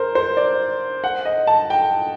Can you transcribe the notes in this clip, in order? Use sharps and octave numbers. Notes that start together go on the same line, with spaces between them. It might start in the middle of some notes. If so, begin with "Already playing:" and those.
Already playing: A#4 C5
C5
D5
F#5
D#5
A5
G5